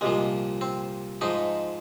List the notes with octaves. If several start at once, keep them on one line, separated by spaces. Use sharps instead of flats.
C2 A#2 F3 G#3
C4
G#2 F3 D#4